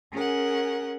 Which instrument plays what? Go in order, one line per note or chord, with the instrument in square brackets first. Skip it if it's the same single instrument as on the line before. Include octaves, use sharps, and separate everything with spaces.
[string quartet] C#4 G#4 A#4 F#5